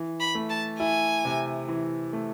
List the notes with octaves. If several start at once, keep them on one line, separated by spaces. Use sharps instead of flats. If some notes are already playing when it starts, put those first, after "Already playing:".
Already playing: E3
B5
A3
A5
E4 G#5
C3
E3
A3